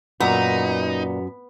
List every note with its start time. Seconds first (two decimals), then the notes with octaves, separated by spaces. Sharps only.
0.20 F#2 A#2 B3 D#4